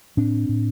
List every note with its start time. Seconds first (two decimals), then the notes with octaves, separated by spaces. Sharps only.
0.17 A2 C4 D4
0.49 A2